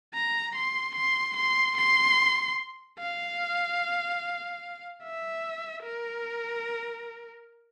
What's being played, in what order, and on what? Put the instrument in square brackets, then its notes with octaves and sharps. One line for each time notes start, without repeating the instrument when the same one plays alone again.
[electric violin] A#5
C6
C6
C6
C6
F5
E5
A#4